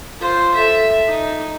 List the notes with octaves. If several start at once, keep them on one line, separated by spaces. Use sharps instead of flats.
F4 C5
A4 E5
D#4